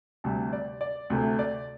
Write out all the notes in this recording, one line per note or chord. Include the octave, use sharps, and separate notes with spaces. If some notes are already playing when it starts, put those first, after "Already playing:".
D2 C3 G3 A5
D5
D5
D2 C3 A3
D5